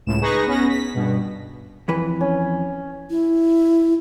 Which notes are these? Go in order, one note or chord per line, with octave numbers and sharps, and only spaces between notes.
C#2 A2 E7
D#4 G#4 B4 C#6 A#6
B3 C#4 B5 A#6
B6
G2 B2
F2 E3 B4
C#4
E4